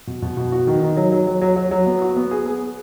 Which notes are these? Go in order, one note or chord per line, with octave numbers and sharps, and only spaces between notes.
B2
B2
B2
F#4
D#3
D#3
F#3
F#3
F#3
F#3
F#3
F#3
B3
F#4
B3
G#4
G#4